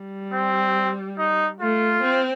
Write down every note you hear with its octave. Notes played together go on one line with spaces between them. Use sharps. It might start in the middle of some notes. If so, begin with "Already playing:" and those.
Already playing: G3
C4
D#4
A3 F4
C4